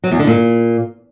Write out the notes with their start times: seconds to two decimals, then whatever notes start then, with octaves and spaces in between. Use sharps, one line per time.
0.04 F#3
0.11 E2
0.19 D3
0.27 A#2